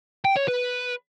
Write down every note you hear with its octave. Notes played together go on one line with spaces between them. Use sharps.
G5
C#5
B4